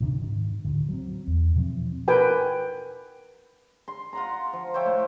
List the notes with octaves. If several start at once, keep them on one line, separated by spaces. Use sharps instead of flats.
D1 C3 D#3 D4
G#2 D#3
D2 A2 D3
F#3 C4
E2
B2 E3 F3 C4
A#4 B4 G5 G#5
C6
F4 F#5 A#5
F3
C5 C#5 E5 G5
A2